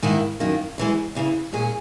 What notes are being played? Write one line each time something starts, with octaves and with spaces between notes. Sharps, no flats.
G#2 D#3 A#3 E4
F#2 D#3 A#3
F#2 E3 G#3
E2 C#3 E3
A#2 G#3 C#4 G#4